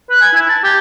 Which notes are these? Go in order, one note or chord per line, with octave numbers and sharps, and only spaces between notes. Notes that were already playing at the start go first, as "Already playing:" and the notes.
B4
G#5
E4
A5
G4